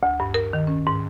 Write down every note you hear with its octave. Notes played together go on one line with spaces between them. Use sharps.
D2
G2
A#4
D#3
C#4
G#2